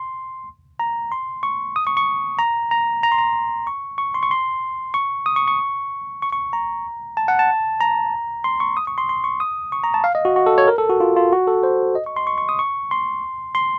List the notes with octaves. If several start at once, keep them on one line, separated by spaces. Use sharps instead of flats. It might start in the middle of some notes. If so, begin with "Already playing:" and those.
Already playing: C6
A#5
C6
C#6
D#6
C#6
C#6
A#5
A#5
A#5
C6
A#5
C#6
C#6
C6
C#6
C6
C#6
D#6
C#6
C#6
C#6
C#6
A#5
A5
F#5
A5
A#5
C6
C#6
D#6
C#6
C6
C6
C#6
D#6
C#6
A#5
A5
F5
D#5
F#4
F#4
A4
C#5
A#4
A4
F#4
F4
F4
F#4
A4
C5
D#5
C#6
C6
C#6
C#6
D#6
C#6
C6
C6